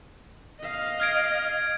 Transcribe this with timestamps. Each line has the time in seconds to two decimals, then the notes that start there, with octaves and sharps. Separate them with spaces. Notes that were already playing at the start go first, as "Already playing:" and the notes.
0.60 D#5 F5
1.00 F6 G#6 D7